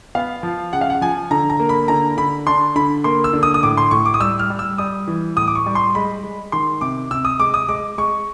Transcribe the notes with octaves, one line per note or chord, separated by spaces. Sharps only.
B3 F5
F3
C#3 F#5
F5
F#5
F3 G#5
D3 A#5
A#5
A#3
B5
D3 A#5
D3 B5
D4 C6
D3 B5
A#3 C6
E6
D3
D#6
D#6
A2 D6
C6
A2 C#6
D6
D#6
G3 E6
F6
G3
E6
G3 D#6
E3
A2 D#6
D6
C#6
G3
C6
G#3 B5
G#3
D#3 C6
C3 D6
C3 E6
D#6
G#3 D6
D#6
G#3 D6
G#3 C#6